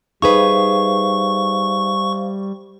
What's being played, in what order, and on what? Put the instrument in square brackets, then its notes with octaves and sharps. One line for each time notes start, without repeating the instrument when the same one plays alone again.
[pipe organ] G3 [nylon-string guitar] D#4 G#4 B4 [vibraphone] C5 E5 F5 [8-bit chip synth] C#6